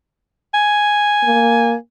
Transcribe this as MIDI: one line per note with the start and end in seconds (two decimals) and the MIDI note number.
0.54 1.73 80
1.24 1.75 58